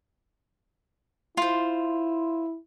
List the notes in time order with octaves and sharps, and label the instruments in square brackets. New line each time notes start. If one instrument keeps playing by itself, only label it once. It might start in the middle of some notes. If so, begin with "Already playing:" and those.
[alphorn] E4 [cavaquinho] F4 C5